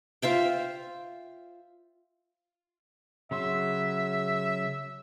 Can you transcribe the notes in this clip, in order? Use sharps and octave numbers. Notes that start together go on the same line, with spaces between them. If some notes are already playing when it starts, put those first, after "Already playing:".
F4 C5 E5 G5
C#3 F#3 E5 C6